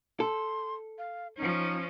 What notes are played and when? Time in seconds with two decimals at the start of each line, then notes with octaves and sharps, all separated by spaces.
0.20 A4 C6
0.98 F5
1.37 F3 C#4 D#4